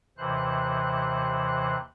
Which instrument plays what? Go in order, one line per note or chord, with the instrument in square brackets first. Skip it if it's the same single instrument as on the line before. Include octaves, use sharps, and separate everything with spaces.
[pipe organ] D#2 C3 E3 C5 F#6